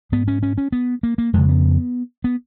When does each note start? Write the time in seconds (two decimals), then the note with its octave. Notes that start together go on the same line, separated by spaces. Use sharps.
0.12 G#2 B3
0.28 C#4
0.43 C#4
0.58 C#4
0.72 B3
1.03 A#3
1.18 A#3
1.33 F2 C#3 G#3
1.49 B3
2.24 B3